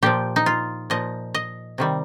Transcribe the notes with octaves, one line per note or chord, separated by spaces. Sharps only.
A#2 F3 G4
D#4
F4
A#2 F3 D#5
D#5
C3 D#3 G3